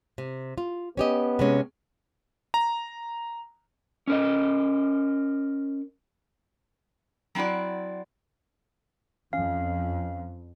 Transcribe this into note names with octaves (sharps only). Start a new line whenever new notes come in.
C3
F4
B3 C#4 G4 D#5
C3 G#3 C#4
A#5
C#4 A#4 D#5
F#3 C4 E4 F#4 D5
F2 C#4 F5